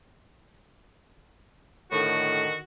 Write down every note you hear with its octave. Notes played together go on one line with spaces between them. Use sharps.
A2 D3 D#3 F#4